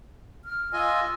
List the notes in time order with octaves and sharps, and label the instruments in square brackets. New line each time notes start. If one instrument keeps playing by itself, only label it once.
[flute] F6
[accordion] F4 D#5 G#5 [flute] E6